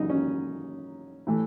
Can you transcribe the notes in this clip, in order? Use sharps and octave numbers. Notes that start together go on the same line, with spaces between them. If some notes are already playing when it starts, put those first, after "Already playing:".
Already playing: F#2 C#3 E3 D#4
C#4
A2 E3 A3